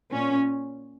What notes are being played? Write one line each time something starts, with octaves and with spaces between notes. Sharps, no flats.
A#2 C#4